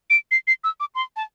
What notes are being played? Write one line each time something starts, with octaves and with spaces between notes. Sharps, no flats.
D7
C7
C7
E6
D6
C6
A5